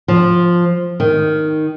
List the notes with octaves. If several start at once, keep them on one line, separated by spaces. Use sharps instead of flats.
F3
D#3